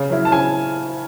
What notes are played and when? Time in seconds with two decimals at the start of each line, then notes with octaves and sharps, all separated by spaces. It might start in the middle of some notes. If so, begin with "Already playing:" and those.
Already playing: C#3
0.10 F#3 C#4 E4
0.25 A5
0.32 C#3 G#5